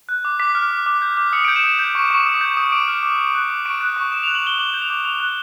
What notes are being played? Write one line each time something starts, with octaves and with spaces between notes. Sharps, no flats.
F#6
D6
D6 B6
F6
D6
D6
G6
D6
D#6 C#7
D7
G6
E7
D#6
G6
C#6
C#6
D#6
G6
D#6
D6 D7
F6
D6
D6
F#6
D6
C#6 D7
F#6
C#6
D#6 E7
F7
F#6
F#7
D#6 G7
D6 F#7
G6
F7
D6
D6 F7
F#6